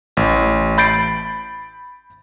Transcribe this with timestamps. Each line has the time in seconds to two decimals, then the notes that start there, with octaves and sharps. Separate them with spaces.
0.17 A1
0.78 B5 G6 A6 C7 D7